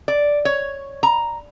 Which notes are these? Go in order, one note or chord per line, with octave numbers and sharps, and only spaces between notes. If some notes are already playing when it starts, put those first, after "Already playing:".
D5
C#5
A#5